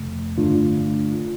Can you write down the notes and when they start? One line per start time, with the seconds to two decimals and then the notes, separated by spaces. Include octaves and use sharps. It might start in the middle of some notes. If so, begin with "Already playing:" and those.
Already playing: F2 C3 A3
0.38 G2 D3 A3 D4 F4